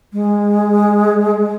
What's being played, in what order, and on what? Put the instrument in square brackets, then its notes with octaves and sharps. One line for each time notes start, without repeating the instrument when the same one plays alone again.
[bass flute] G#3